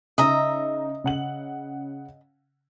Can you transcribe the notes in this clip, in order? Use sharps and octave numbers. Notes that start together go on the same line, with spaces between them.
C#3 D#4 D#5 E5 A#5
C#3 F#5 F#7